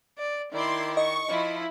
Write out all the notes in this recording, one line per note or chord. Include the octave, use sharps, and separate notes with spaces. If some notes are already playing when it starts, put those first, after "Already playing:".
D5
D#3 E4 D5 C6
D#5 C#6
F3 E4